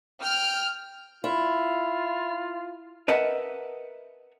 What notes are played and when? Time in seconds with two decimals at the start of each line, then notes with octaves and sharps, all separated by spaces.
0.22 G5 F6
1.24 E4 F4
3.08 A#4 B4 D#5 E5 F#5 A5